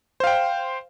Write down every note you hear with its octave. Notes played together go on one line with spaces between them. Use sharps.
C5 F5 G5